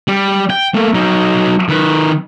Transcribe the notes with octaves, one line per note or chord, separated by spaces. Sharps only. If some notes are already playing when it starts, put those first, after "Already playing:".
G3
G5
A3 A#3
F#3 D#4
D#3 B4